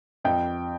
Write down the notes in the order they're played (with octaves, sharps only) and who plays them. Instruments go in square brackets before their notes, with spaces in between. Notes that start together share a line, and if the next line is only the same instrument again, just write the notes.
[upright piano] F2 G5